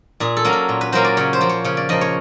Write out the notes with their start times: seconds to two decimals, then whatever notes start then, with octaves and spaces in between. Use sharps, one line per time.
0.20 A#2 G#4
0.37 A4
0.45 F#3 A#3 C#4
0.53 A4
0.69 A#2
0.81 B4
0.92 F#3 A#3 C#4 C5
1.05 D5
1.17 C#3 C#5
1.33 C5
1.41 F3 A#3
1.49 C#5
1.64 C#3 C#5
1.77 D5
1.89 F3 A#3 D#5
2.01 C#5